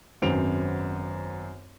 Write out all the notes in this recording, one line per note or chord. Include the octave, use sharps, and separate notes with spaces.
G#1 F#2 B3 C4 D7 F7